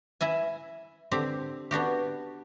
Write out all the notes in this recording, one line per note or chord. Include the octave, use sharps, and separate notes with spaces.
E4 E5 G#5
D3 C4 G4
B3 D4 F#4 G4